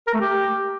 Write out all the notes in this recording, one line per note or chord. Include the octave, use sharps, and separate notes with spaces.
A#4
A3
G4